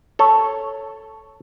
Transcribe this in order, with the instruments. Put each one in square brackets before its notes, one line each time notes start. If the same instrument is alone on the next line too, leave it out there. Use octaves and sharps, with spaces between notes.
[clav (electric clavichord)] A4 C#5